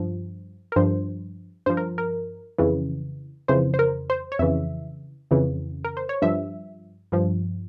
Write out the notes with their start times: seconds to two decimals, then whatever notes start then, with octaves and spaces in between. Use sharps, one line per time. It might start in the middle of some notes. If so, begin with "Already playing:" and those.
Already playing: G2 F3
0.72 A#4
0.76 G2 F3 C5
1.66 G2 F3 C5
1.77 A#4
1.98 A#4
2.58 F2 C#3 E3
3.48 F2 C#3 E3 C5
3.74 C5
3.79 A#4
4.10 C5
4.32 C#5
4.39 F2 C#3 E3 E5
5.31 F2 C#3 E3
5.84 A#4
5.97 C5
6.09 C#5
6.22 G2 F3 E5
7.12 G2 F3